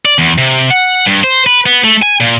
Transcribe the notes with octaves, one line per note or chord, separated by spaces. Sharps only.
D5
E2
C3
F#5
G2
C5
B4
B3
A3
G#5
A#2